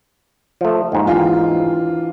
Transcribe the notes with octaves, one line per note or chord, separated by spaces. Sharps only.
F3 A3
D#2 G#2
E3 D4 F4